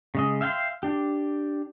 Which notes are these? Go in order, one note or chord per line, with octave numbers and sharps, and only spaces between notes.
C#3 G#3 D#5
E5 F5 G5 G#5 C6
D4 G4